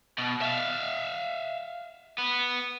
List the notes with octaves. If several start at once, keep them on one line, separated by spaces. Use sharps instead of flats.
B2
E5 F5
B3